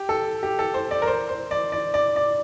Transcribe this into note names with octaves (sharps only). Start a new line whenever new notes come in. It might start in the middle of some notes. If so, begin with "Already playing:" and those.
Already playing: G4
A4
G4
A4
C5
D5
A#4
C5
C5
D5
D5
D5
D5